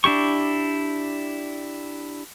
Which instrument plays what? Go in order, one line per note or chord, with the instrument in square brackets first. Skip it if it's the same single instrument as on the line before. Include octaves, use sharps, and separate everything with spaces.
[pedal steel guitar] D4 E4 G4 C#6